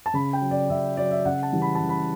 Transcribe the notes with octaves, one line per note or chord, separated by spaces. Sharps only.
A5
C#3 B5
G5
F#3
D5
C#3 E5
F#3 D5
E5
C#3 F#5
A5
E3 G3
B5
C#3 A5
B5